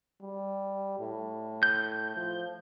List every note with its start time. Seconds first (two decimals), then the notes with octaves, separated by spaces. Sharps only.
0.22 G3
1.00 A2
1.63 G6
2.17 F3